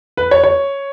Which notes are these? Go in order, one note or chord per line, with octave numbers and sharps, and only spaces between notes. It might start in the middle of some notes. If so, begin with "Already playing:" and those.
B4
C#5
C#5